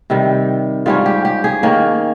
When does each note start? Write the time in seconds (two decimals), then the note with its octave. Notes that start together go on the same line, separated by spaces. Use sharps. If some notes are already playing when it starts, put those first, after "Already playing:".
0.10 C3 D#3 G3
0.86 G#2 G3 C#4 F4
1.06 G4
1.25 G4
1.44 G#4
1.63 D#3 A#3 C#4